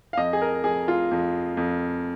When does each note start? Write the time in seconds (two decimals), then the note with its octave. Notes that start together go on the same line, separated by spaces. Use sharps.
0.13 F5
0.17 F2 D#5
0.33 G#4
0.42 A#4
0.64 F2 G#4
0.88 F4
1.11 F2
1.57 F2